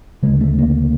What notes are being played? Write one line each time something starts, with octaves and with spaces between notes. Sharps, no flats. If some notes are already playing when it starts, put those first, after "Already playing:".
D2 C#3 G#3
A3
A#3